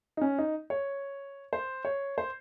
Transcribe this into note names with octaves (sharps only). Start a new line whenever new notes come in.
D#4
C#4
D#4
C#5
C5
C#5
C5